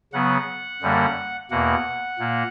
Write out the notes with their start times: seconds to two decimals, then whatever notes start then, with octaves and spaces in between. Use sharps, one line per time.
0.13 C#3 F#3 B3 F#5
0.82 F#2 D3 G3 A#3
1.51 E2 B2 A#3 F#5
2.19 A#2 A#3